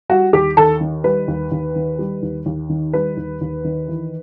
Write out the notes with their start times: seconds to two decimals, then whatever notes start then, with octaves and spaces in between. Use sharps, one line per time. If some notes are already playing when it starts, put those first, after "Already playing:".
0.09 G3 F#4
0.33 D#2 G4
0.57 D#2 A4
0.81 D#3
1.04 G3 B4
1.28 D#2
1.52 D#2
1.76 D#3
1.99 G3
2.22 D#2
2.46 D#2
2.69 D#3
2.93 G3 B4
3.17 D#2
3.41 D#2
3.64 D#3
3.88 E3